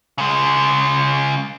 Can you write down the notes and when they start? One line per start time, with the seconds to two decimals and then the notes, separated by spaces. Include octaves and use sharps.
0.18 C#3 G#3